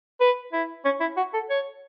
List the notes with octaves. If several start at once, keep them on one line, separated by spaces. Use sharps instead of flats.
B4
E4
C#4
E4
F#4
A4
C#5